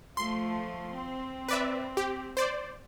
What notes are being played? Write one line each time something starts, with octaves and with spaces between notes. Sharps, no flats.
F3 A3 C6
C4
B4 D5 E5
G4
C5 D5